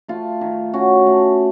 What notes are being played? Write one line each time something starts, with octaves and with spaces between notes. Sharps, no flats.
A3 F4
D#3
C#4 F#4
A3